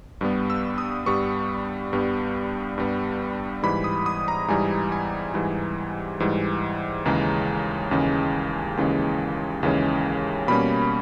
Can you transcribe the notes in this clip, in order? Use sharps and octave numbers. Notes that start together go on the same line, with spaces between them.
G2 G3 B3
E6
D#6
G2 G3 B3 C#6
G2 G3 B3
G2 G3 B3
G#2 E3 G3 B5
D#6
D#6
A#5
G#2 E3 G3 G#5
G#5
G#2 E3 G3
G#2 E3 G3
D#2 C#3 E3 G#3 C#4 A#5
D#2 C#3 E3 G#3 C#4
D#2 C#3 E3 G#3 C#4
D#2 C#3 E3 G#3 C#4
B2 G3 A#3 C#4 B5